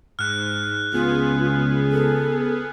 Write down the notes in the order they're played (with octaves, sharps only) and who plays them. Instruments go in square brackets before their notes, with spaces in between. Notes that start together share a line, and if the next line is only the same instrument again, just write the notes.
[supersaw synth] G#2 [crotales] F6 F#6
[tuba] C#2 [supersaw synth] B3 G#4 [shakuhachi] F4
[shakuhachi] A4